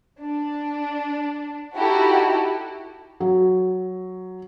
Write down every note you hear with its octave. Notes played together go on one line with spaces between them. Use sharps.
D4
D#4 E4 F#4 G4 A4
F#3